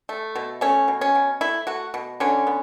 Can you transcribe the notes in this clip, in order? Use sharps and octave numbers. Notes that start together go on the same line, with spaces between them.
A3
B2
A3 C#4
B2
C#4
B2
A3 E4
A3 F#4
B2
D3 C#4
B3